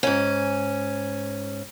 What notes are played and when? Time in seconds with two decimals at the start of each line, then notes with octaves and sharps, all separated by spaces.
0.03 G#2 C#4